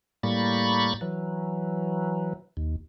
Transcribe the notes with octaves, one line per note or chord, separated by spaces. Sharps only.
A2 G3 A#3 B5 C#6 A6
E3 F#3
D#2